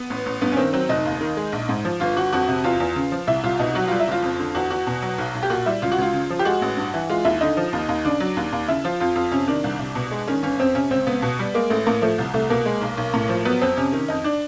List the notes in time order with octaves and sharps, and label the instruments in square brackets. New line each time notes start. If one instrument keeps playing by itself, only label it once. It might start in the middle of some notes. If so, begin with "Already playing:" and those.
Already playing: [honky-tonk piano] B3
A1
A1
G2 B3
C#4
D#3 C4
F#3 C4
F1 D#4
D#2
D#3
G#3
A#1
G#2
F3
G1 F4
G1 F#4
F2 F#4
C3
E2 F4
E2
C#3
F3
C2 E4
C2 F4
B2 D#4
F#3 F#4
G3 F4
E4
F#1 F4
F2
D3
E2 F#4
E2 F#4
B2
F#3
B1
B1
G4
A#2 F#4
G3 E4
C#2 F4
F#4
C#2 F4
C#3
F3
G4
G#3 F#4
A1
G2
E3
G#3 F4
D#2 E4
D3 D#4
F3
D#2
D#2
C#3 D4
F#3
D#2
D#2
C#3 E4
F3 F4
F2 F4
F2 F4
C3 C#4
D#3 D4
C2
C2
B2
G#3
D#3 C#4
G1 C#4
F2 C4
C3 C#4
C#2 C4
C#2 B3
B2
G3
G#3 A#3
A1 A3
A2 A#3
F3 A3
C2
C2 A3
B2 A#3
G#3
B1
B1
A2
F3
F#3 B3
F2 C4
C3 C#4
D#3
F2 D#4
D4